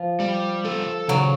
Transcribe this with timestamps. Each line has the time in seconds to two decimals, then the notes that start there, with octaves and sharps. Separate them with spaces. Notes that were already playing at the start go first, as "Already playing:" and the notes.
Already playing: F3
0.20 G3
0.65 A4
1.08 C#3 F#3